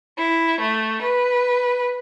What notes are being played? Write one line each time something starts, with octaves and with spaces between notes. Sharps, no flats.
E4
A3
B4